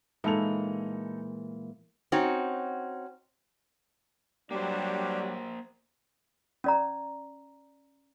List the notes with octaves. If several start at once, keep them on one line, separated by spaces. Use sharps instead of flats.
A#2 E3 G#3 D#4 A4 F7
C4 C#4 D#4 F#4
F#3 G3 A#3 D4 G4 C5
C#4 D5 A#5